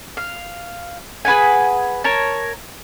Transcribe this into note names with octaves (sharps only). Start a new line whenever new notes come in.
F5
G#4 B4 F#5 G#5
A#4 C#5 A5